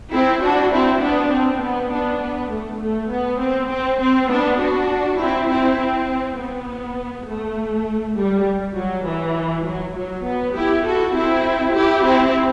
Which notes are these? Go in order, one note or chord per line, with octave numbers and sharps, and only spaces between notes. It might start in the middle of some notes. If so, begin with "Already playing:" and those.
C4 E4
D4 F#4
C4 E4
B3 D4
C4
B3
B3 D4
B3
A3
A3
B3
C4
C4
C4
B3 D4
D4 F#4
C4 E4
C4 E4
C4
B3
A3
G3
F#3
E3
F#3
F#3
B3
E4 G4
F#4 A4
C4 E4
E4 G4
C4 E4